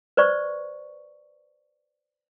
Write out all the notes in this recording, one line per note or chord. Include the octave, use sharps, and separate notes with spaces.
B4 C5 D5 C#6